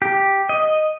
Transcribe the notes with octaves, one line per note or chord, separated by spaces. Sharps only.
G4
D#5